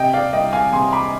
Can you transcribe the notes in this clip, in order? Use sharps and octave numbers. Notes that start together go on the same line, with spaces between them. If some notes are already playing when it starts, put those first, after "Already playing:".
Already playing: C3 D#5 G5
D5 F5
C2 D#5 G5
F5 G#5
C3 G#5 C6
B5 D6